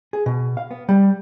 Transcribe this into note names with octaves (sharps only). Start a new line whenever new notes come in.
G#4
B2
F5
B3
G3